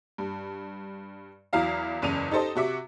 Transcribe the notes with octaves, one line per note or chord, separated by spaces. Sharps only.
G2
E2 F#3 E4 F5 A#5
F#1 E2 C#3 D#7 F7
D#4 G4 A4 C5 D#5
C3 F#4 E5 D6